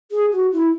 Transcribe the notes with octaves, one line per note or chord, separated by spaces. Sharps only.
G#4
F#4
E4